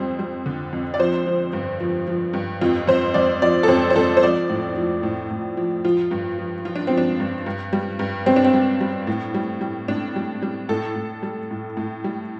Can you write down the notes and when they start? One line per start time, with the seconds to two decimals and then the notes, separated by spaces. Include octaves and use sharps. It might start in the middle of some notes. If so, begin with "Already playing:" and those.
Already playing: F2 G3 C5
0.19 G3
0.46 D3
0.73 F2
0.94 D5
1.00 F3 C5
1.26 F3
1.53 G2
1.80 F3
2.08 F3
2.33 G2
2.61 F2 F4
2.87 F2 C5
3.14 F2 D5
3.42 F3 D5
3.63 A4
3.68 F2 C5
3.90 C5
3.96 F2 A4
4.17 C5
4.22 F3 D5
4.50 A2
4.76 F3
5.03 A2
5.31 A2
5.57 F3
5.85 F3 F4
6.11 G2
6.38 F3
6.65 F3 F4
6.76 D4
6.87 F3 C4
6.98 D4
7.20 G2
7.46 G2
7.73 G3
7.99 G2
8.26 G3 C4
8.36 D4
8.44 C4
8.53 G3
8.81 G3
9.07 A2
9.34 G3
9.61 G3
9.88 A2 D4
10.16 G3
10.42 G3
10.69 A2 A4
10.96 A2
11.23 G3
11.51 A2
11.77 A2
12.04 G3